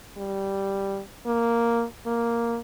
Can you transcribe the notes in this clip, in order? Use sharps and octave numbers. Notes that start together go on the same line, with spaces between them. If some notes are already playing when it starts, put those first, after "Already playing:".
G3
A#3
A#3